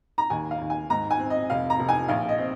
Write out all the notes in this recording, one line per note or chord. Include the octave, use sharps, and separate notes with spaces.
A#5
D#2 G#5
F5
D#2
G#5
G#2 A#5
G#5
C4
D#5
F1 F5
A#5
F1
G#5
A#1 F5
D#5
C4